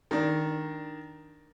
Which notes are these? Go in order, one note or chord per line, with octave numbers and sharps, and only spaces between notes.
D#3 D4